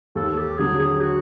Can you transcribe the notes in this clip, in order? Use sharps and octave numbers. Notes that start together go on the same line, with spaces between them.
D#2 A4
G4
D3 F#3 G#4
G#4
F#4